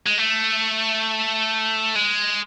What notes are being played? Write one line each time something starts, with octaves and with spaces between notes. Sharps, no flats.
G#3
A3
G#3